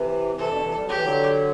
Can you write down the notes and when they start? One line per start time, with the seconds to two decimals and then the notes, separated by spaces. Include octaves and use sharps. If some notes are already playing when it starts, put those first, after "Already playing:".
Already playing: C3 E3
0.37 C3 E3 A4
0.50 B2 D3
0.63 C3 E3
0.76 G3
0.85 F#3 G4
0.95 E3
1.04 D3 F#3